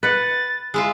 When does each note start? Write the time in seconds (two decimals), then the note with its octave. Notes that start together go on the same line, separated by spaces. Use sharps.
0.03 B4 F#5 A6
0.74 G#3 E4 F4 E6